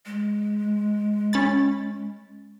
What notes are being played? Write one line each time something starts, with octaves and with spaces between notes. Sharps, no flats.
G#3
C#4 B5 A6